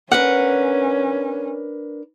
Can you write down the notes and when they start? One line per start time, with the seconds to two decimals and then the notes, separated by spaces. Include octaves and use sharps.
0.11 C#4 D4 A#4 B4 F#5